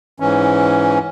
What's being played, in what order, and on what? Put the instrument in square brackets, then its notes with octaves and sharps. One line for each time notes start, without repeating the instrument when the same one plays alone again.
[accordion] G#2 E3 C#4